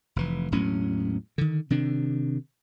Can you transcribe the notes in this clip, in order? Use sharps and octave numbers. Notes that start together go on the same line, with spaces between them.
F1 E3
E1 A2 F#3 C#4
D3 D#3
C3 D#3 D4